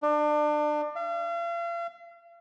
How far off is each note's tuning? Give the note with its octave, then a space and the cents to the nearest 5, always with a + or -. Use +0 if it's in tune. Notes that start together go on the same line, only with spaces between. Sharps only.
D4 +30
F5 -40